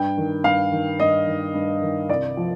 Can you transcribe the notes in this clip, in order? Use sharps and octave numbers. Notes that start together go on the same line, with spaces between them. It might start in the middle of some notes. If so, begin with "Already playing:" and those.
Already playing: G2 G5
D#3
G2 F5
D#3
G2 D#5
D#3
G2
D#3
C2 D5
F3